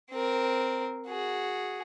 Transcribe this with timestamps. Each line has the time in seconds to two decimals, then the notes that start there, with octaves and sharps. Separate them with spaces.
0.11 C4 A#4
1.08 F#4 G#4